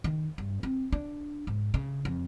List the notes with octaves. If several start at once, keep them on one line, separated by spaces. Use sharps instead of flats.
D#3
G2
C4
D4
G#2
C#3
F2